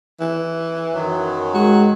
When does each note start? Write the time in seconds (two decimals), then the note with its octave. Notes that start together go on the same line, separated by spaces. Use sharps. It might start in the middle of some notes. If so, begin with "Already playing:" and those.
0.20 E3
0.93 F#2 D#3 F#3
1.54 G#3 F#4